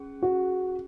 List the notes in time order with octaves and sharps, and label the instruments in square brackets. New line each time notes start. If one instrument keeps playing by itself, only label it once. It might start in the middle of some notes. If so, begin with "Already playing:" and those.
Already playing: [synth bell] C#4 G#4
[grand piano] F#4